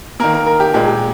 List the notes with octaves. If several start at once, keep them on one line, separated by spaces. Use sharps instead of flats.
D#3 A#3 A#4
A#4
A#4
G4
A#2 G#3 G4
G4